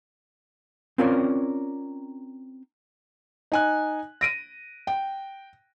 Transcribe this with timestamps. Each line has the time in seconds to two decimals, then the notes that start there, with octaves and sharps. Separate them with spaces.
0.98 C4 C#4 F4 A#4 C#5 D5
3.52 D#4 G#5 F#6
4.21 A#6 D7 D#7
4.87 G5